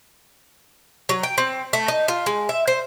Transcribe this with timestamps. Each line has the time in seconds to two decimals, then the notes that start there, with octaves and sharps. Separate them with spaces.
1.09 F#3
1.23 G5
1.38 C4
1.73 A3
1.88 D#4
2.08 F4
2.26 G#3
2.49 E5
2.67 C5